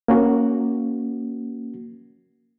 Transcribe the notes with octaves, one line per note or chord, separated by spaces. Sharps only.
A#3 C#4 F#4